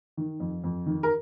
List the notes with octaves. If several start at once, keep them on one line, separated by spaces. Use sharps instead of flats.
D#3
F2
F2
D#3
A#4